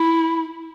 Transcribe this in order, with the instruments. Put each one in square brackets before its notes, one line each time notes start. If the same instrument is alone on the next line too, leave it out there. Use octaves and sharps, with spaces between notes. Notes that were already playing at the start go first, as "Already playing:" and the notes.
Already playing: [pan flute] E4